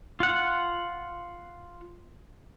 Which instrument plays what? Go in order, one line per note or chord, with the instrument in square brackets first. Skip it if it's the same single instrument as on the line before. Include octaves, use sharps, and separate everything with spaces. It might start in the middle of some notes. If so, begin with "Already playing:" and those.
[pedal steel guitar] F4 F#5